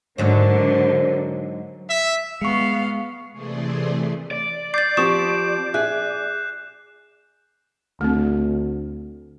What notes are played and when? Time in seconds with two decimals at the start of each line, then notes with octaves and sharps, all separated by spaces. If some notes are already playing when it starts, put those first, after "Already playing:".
0.18 G#2 D3 F#3 A#4 C5
1.87 E5
2.41 G#3 B3 F5 C#6 C#7
3.32 C3 E3 A3 G#4 D5 C6
4.31 D5
4.74 D6 G6 A6 C7
4.97 F3 C4 G4 C#6 D#6 E7
5.74 G#4 E5 F#6
8.01 D2 A3 C4